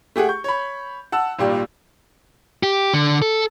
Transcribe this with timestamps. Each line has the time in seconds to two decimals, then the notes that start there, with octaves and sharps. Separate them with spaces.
0.16 A3 G4 G#4 F#5
0.29 C#6 G6
0.44 C#5 B5
1.12 F#5 A5 E6
1.39 G#1 A#2 G3 G4
2.63 G4
2.94 D3
3.22 A4